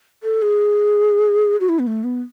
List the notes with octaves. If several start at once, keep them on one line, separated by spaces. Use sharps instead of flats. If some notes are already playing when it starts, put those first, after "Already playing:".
A4
G#4
F#4
E4
B3
A3
B3